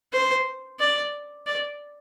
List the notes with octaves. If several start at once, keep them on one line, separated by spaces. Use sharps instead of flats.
C5
D5
D5